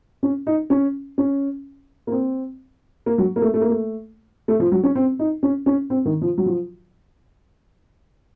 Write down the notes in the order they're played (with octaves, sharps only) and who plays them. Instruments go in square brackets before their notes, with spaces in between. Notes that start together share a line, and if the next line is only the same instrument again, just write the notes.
[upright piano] C#4
D#4
C#4
C#4
A#3
C4
A#3
F#3
A#3
A3
A3
A#3
A3
A3
F3
F#3
C#4
C4
D#4
C#4
C#4
C4
D#3
F3
F#3
F3